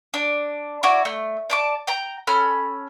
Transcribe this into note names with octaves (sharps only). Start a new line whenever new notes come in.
D4
E4 F#4 D5
A3
D5 A5 D6
G5 A#5
C#4 A4 B5 F6